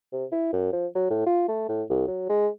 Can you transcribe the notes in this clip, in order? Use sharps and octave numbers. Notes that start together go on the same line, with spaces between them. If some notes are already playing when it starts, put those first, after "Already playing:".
C3
E4
F#2
F3
F#3
A2
F4
A3
A2
C2
F#3
G#3